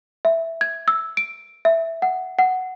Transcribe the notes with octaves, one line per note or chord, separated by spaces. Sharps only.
E5
G#6
E6
D7
E5
F#5
F#5